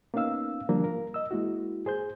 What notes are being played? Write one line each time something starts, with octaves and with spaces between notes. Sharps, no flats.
A#3 B3 C#4 D#4 F5 E6
D3 F3 G3 A#3 D4
A#4
D#5 E6
G#3 A#3 E4 F#4
G#4 C5 G6